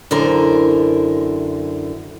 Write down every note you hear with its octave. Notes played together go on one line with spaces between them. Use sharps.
F#2 D3 E3 A#4 C5